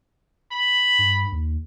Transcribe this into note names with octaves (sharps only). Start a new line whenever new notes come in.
B5
G2
D#2